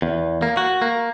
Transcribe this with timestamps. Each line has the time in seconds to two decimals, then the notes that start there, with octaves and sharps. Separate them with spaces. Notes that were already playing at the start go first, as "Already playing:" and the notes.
0.02 E2
0.42 A#3
0.57 F#4
0.82 A#3